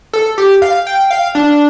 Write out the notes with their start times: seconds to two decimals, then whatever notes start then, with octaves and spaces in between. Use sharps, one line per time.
0.13 A4
0.38 G4
0.62 F5
0.87 G5
1.11 F5
1.35 D4